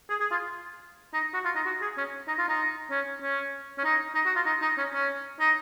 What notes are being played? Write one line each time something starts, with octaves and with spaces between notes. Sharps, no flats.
G#4
G#4
F4
D#4
F#4
F4
D#4
F#4
G#4
C#4
D#4
F4
D#4
C#4
C#4
C#4
D#4
D#4
F#4
F4
D#4
D#4
C#4
C#4
D#4